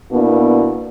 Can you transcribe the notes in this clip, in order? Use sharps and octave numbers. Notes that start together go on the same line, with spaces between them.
B2 A#3 B3 D4 E4